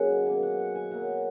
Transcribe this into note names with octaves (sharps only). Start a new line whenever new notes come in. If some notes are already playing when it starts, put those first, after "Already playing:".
Already playing: C#3 F#3 A#3 G#4 D#5 F#5
G#5
B2 A#3 G#5
F#5
F#5
G#5
B2 F#3 A#3 F#5